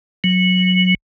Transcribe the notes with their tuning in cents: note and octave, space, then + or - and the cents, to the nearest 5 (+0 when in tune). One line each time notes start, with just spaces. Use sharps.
F#3 -10